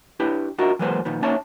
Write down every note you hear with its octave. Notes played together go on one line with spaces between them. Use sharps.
D4 E4 G4 B4
D4 F4 F#4 A#4 D#5 E5
E3 F#3 G#3 A#3 B4 C5
A#2 D#3 F3 B3
A#3 C#4 D#4 C#5 E5 A5